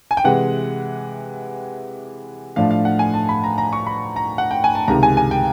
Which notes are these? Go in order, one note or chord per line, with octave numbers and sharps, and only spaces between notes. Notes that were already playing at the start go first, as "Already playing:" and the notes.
G#5
G5
C3 E3 G#3 F#5
A2 F3 A3 D4 F5
F5
F#5
G#5
A5
B5
A#5
A#5
C#6
B5
A#5
F#5
G5
G#5
A5
C#2 C3 D#3 A#5
G#5
G#5
G5